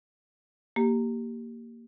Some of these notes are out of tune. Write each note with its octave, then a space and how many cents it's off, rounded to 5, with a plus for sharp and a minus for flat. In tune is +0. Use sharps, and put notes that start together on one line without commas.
A#3 -5 G4 -5